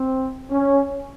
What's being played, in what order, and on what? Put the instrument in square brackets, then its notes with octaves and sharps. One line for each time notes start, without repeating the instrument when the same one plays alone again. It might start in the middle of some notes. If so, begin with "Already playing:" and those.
Already playing: [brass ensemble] C4
C#4